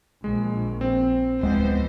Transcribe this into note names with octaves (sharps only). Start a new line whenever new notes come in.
A#1 G#3
C4
D1 E3 F3 G#3 B3 C5